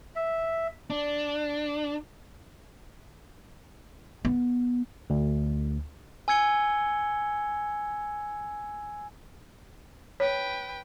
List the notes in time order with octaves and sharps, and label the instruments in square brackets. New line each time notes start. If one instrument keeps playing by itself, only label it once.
[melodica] E5
[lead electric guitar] D4
[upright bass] B3
[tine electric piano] D2
[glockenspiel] G#5 E6 G#6 C#7 G7
[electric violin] B4 G5 [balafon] C#5